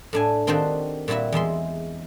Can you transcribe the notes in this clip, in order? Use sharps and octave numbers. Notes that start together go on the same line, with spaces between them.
A2 D4 G#5
D#3 C4 D4 F#4 G4 C5
A#2 G3 E4 F#4 E5
E2 G#3 E5 C6